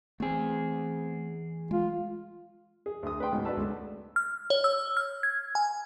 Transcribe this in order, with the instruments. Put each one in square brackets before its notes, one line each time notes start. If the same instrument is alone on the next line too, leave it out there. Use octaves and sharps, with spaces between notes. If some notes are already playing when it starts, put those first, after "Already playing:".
[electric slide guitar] E2 G#4 [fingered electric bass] A3 C4
[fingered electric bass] G#3 [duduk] F4
[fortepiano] G#4
D2 D#6
B4 D5 G5 C6
C#2 G#2 B2
D4 F#4 B4 A5 E6
C#2 A3
[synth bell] F6
C#5
E6
F6
G#6
G#5